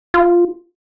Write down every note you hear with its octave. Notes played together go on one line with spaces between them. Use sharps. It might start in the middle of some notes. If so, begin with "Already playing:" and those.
F4